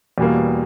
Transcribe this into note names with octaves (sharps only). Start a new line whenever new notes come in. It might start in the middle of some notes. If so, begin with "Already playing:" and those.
E2 B2 G3 A#3